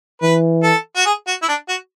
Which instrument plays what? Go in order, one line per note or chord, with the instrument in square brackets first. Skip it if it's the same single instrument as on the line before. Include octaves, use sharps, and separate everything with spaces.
[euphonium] E3 [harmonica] B4
[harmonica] A4
F#4
G#4
F#4
E4
D4
F#4